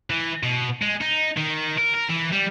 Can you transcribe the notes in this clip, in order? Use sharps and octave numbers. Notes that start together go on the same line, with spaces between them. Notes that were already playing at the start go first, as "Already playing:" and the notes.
E3
B2
G#3
D#4
D#3
A#4
A#4
E3
G3